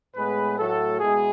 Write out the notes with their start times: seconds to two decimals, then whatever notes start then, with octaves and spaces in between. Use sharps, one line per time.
0.15 A2 G#3 B3 G#4 B4
0.57 A2 F#3 A3 F#4 A4
1.00 B2 G#3 E4 G#4